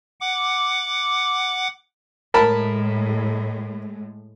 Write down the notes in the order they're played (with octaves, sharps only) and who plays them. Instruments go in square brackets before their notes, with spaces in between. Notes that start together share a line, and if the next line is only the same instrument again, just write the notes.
[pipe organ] F#5 D6
[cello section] A2 G#3 [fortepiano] A#4 A5 B5